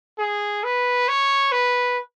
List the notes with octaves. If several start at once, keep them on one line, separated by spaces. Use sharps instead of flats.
G#4
B4
C#5
B4